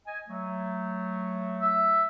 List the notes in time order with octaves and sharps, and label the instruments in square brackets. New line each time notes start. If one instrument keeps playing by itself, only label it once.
[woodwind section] D#5 G#5
F#3 A3
[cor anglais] E5